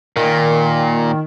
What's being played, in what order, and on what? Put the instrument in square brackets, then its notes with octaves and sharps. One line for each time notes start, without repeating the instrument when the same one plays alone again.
[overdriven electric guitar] A#2 [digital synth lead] D#3